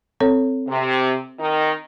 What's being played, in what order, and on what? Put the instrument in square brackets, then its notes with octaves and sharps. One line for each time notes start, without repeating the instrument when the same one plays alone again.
[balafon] C4 A4 C#5
[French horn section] C3
D#3 D#4